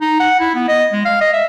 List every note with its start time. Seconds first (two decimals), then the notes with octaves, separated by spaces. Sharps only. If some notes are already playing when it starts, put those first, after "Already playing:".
0.01 D#4
0.20 F#5
0.40 E4
0.55 B3
0.68 D#5
0.92 G#3
1.05 F5
1.21 D#5
1.33 E5